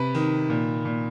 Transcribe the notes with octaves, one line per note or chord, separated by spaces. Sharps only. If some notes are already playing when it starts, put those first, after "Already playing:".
Already playing: C3 B4
D#3
A#2
A#2